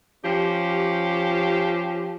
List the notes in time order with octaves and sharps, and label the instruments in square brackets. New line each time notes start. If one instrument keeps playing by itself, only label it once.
[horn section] F3 C#4 G4